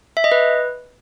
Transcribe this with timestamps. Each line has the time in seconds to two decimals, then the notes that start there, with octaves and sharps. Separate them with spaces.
0.17 E5
0.24 D#5
0.32 B4